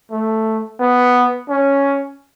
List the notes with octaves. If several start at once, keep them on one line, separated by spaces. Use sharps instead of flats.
A3
B3
C#4